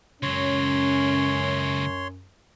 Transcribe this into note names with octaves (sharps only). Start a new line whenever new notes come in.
C#2 F#2 F#3 C#4 C#5 C6